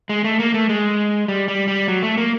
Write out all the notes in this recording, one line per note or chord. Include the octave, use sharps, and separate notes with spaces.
G#3
A3
A#3
A3
G#3
G3
G3
G3
F#3
A3
A#3